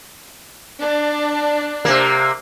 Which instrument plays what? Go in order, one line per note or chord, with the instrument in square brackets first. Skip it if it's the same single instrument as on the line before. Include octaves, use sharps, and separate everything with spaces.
[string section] D4
[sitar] C3 A#3